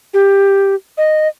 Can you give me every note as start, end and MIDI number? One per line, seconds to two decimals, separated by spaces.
0.14 0.75 67
0.97 1.28 75